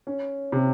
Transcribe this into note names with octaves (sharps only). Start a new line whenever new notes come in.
C#4
C3